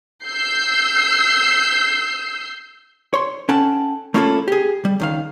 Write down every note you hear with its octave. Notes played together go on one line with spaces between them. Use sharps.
E6 G6 C7
C#5 C6
C#4 A4 F#5 G5 A5
A3 A#3 C#4 E4 F4 A4
G4 G#4
G3
C#2 D#3 F5